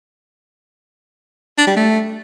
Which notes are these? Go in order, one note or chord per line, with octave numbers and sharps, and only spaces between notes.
D4
G3
A3